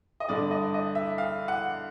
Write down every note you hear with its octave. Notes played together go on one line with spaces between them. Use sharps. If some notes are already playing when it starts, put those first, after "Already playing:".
D#5
G2 D3 D5
D#5
D#5
E5
F5
F#5